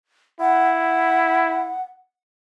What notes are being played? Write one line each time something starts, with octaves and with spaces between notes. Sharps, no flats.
E4 F#5